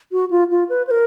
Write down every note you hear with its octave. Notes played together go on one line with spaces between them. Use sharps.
F#4
F4
F4
B4
C5
A#4